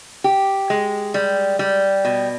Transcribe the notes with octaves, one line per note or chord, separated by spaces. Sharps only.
G4
G#3
G3
G3
B2